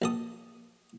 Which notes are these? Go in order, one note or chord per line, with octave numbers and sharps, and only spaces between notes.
A#1 A4 D#6